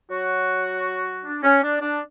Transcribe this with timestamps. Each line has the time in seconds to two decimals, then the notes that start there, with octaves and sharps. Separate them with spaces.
0.10 F#3 F#4
1.24 D4
1.43 C#4
1.63 D4
1.81 D4